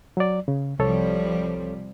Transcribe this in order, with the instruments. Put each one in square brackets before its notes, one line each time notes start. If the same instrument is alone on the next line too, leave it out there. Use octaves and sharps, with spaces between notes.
[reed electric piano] F#3 D5
C#3
[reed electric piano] C2 A4 C#5 [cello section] C3 F3 G3